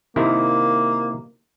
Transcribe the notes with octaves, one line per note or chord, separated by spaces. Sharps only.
C3 D#3 A#3 E4